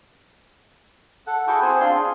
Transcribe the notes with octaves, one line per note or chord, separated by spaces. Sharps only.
A4 F#5
E4 F#4 G#4 A4 G5 C#6
C4 G#4 C5 G#5
C4 D4 F4 C6
G#4